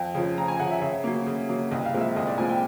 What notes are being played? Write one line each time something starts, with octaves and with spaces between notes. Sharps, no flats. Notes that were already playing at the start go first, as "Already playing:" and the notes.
Already playing: F2
C#3 F3
F2 A#5
G#5
C#3 F#5
F3
E5
C#3 E5
F#3 A#3
C#3
F#3 A#3
C2 D#5
F5
A#2 F3 G#3 C4
E5
C2 D#5
D5
A#2 F3 G#3 C4 G#5
G5